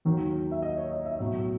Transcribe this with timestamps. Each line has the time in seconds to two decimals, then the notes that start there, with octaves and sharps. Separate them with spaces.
0.05 D#2 D#3 F#3
0.51 E5
0.63 D#5
0.77 C#5
0.91 D#5
1.05 E5
1.20 B1 A2 F#3